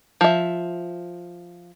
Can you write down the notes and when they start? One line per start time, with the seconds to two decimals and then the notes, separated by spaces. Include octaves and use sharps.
0.21 F3 E5